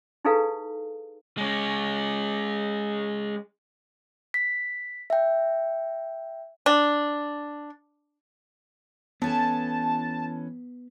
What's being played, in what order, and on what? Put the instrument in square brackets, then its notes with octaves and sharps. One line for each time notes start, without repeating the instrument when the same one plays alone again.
[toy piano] D#4 E4 G#4 A4 B4 F5
[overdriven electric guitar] G#3 C#4
[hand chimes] B6
E5 G5
[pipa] D4
[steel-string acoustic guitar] E3 C#4 A4 [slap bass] B3 [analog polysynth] A5